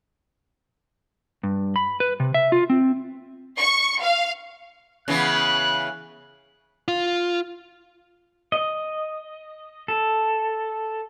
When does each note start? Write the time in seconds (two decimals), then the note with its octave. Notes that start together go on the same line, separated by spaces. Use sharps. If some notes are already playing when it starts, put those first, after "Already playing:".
1.43 G2
1.76 B5
2.00 B4
2.20 C3
2.34 E5
2.52 F4
2.70 C4
3.58 C#6
4.02 F5
5.08 C#3 E3 B3 F#6
6.88 F4
8.52 D#5
9.88 A4